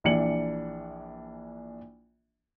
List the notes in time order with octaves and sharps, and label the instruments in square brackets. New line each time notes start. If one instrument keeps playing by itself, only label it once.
[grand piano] A#1 E3 D4 C#7 F#7